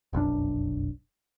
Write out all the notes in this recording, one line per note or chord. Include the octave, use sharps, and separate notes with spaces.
F1 B1 F#2 D4